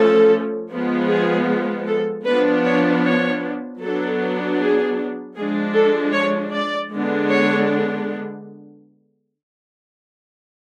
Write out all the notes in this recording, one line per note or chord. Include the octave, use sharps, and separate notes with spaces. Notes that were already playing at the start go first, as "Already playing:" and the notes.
Already playing: F3 A3 C#4 A4
F3 G#3 B3
G#4
A4
F3 B3 D4 B4
C#5
C#5
F#3 B3 D4 A4
G#4
F3 G#3 D4 G#4
A4
C#5
D5
D3 G#3 B3 D4
C#5